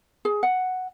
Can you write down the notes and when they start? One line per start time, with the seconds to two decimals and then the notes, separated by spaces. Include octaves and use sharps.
0.25 G#4
0.43 F#5